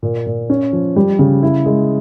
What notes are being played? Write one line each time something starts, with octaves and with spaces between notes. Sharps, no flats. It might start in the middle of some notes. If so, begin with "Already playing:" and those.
A#2
A#2
C#4
F3
G3
C#3
E4
G#3